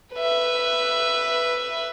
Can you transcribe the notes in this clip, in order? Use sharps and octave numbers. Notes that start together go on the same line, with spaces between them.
B4 E5